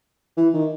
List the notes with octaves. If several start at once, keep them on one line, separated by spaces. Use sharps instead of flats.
E3
D#3